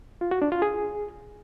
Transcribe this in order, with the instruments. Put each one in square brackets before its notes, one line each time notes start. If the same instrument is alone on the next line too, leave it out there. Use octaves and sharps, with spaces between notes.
[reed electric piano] F4
F#4
D4
F4
G#4